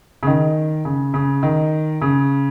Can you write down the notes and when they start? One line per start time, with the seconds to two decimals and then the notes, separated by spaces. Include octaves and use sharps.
0.23 C#3
0.27 D#3
0.85 C#3
1.14 C#3
1.43 D#3
2.02 C#3